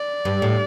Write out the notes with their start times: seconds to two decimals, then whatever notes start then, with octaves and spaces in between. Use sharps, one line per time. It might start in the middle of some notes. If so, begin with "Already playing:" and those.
Already playing: D5
0.25 G2
0.42 A2